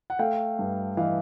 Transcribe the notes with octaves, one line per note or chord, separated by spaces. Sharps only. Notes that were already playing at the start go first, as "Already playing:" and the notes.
F#5
A3 F5 G5
G2
E3 D#5 F5